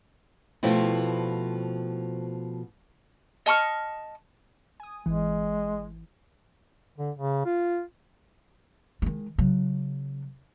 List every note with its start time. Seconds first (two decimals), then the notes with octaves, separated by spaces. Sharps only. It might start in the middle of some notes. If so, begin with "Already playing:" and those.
0.63 B2 F3 A3 C4 E4
3.46 D#5 A5 C#6 F6
4.80 G#5 D#6
5.06 G#1 E3 G#3
6.98 D3
7.19 C#3
7.46 F4
9.02 D#3 G#3
9.38 C#3 F#3